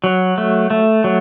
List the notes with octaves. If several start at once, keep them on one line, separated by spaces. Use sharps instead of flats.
F#3
A3
A3
F#3